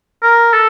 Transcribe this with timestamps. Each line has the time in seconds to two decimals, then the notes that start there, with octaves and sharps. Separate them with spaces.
0.23 A#4
0.53 A4